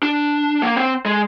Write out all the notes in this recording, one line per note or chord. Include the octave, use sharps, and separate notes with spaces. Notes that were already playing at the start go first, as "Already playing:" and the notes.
D4
A#3
C4
G#3